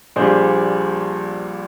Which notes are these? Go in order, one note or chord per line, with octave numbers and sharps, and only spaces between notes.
A#1 A#2 G3 G#4 C5